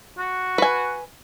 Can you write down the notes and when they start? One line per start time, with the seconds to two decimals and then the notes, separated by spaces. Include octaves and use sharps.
0.19 F#4
0.58 B4 G#5